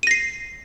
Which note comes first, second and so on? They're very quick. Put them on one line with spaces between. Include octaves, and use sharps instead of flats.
D#7 A#6 C7